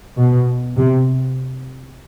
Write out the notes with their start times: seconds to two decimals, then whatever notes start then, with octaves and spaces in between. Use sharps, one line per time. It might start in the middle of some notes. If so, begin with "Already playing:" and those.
0.18 B2
0.77 C3